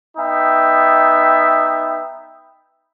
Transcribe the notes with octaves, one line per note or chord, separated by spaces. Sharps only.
B3 D#4 E5 G5